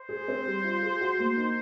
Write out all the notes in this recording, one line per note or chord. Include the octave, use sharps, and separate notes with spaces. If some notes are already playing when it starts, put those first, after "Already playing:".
Already playing: C5
G#4
C4
G3
F4
G#4
F#4
A#3
D#4